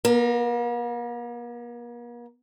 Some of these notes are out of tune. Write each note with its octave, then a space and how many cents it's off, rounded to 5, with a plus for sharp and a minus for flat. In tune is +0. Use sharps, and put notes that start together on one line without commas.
A#3 +45 A#4 -10